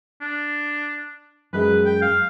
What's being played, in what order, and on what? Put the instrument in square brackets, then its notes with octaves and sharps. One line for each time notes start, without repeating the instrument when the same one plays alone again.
[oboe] D4
[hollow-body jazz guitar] F#2 G#3 [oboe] B4
[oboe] G5
F5